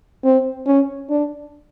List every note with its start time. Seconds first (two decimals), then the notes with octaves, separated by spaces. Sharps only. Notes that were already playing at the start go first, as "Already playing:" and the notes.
0.24 C4
0.67 C#4
1.10 D4